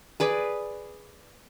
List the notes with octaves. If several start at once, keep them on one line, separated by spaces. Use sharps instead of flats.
G#4 B4 D5